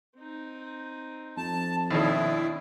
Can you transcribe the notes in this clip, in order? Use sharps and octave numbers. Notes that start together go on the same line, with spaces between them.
C4 D#4
F2 A5
D#2 B2 D4 E4 E5